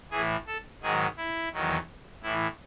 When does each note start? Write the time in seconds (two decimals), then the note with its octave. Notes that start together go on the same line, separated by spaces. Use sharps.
0.11 A2 E3 G#4
0.46 A4
0.82 G#2 D#3 F#3 G#4
1.17 E4
1.52 E2 D#3 F#3
2.22 A2 E3 E4